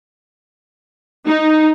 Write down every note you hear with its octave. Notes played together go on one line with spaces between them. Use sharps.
D#4